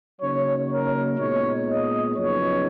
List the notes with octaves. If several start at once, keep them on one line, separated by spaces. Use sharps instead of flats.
C#3 F#3 A#3 D#4 C#5
A#4
A#2 G#3 B3 D#4 C#5
D#5
F#2 C#3 F3 B3 D#4 C#5